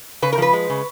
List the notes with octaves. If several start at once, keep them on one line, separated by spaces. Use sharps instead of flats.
C#3 B4
A#4
F3 B4
G#3
C#3